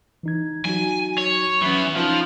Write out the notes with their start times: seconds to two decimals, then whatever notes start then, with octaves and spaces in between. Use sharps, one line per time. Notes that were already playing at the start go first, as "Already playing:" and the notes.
0.23 E3 D#4 G#6
0.65 F#3 D#4 F#4 G#5
1.18 C#5
1.62 E3 F#3 B3 C#4
1.96 F3 C#4 D#4